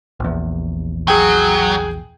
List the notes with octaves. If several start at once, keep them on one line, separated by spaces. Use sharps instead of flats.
A#1 E2
F#3 G#4 G5